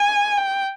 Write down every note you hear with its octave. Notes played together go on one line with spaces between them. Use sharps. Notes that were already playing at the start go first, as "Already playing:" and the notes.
Already playing: G#5
G5